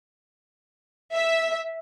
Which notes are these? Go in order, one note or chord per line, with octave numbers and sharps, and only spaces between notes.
E5